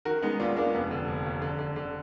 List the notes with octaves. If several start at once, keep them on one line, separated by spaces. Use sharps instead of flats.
D#3 F#4 A#4
G#3 B3 D#4
D#2 D4 F4
G#3 A#3 D4
F1 B3
D3
F1
D#2
D3
D3
D3